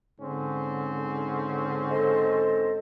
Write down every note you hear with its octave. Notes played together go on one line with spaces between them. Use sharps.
G#2 D3 C4 C#4
A4 C5 D#5